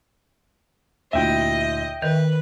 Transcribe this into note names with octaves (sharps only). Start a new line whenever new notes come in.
D2 A#2 E4 D#5 E5 G5
D#3 A#4 B4